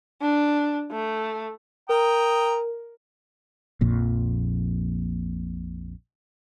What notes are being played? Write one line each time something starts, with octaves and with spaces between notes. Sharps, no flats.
D4
A3
A#4 G5 A#5 D#6
A#1 F2 A#2